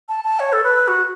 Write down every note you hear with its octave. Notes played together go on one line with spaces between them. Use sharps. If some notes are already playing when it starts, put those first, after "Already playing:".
A5
A5
C#5
A4
B4
F#4